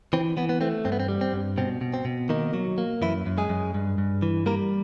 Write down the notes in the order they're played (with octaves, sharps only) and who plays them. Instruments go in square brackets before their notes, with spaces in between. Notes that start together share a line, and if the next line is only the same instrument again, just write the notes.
[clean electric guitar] E3 C4
E3 B3
B3
A3 C4
G2 C4
B3
C4
G3
C4
G2
B2 C4
B2
C4
B2
D#3 A#3 D#4
F#3
A#3
F#2 E3 E4
F#2
G#3 G#4
F#2
G2
G2
E3
G3 A#3 A#4